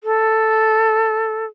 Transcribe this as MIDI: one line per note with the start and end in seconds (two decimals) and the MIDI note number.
0.04 1.45 69